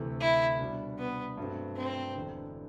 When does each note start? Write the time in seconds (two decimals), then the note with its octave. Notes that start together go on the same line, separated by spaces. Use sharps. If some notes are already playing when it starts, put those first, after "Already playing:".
Already playing: D2 C3 E3 A3
0.20 E4
0.59 B2 G3 D4
0.99 B3
1.37 G2 F#3 A3 C4
1.77 C4
2.16 E1 E2 D3